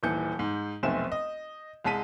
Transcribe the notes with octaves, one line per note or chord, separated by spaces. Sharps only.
D#1 D#2 E3 G6 C#7
G#2
F1 B1 A3 C4 G#5 E7
D#5
C2 G#3 A5 B6 D#7